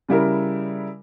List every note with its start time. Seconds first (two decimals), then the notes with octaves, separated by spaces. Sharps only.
0.08 C#3 G3 E4 A#4